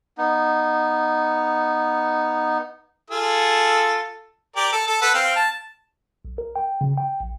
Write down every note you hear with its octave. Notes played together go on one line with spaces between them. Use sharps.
B3 D#4
F4 G#4 A4 E6
G4 A#4 D5
A4
A4
A4 B4 F#5
C4 F5 G5
A5
B1
A#4
G5
C#3
G5
A#1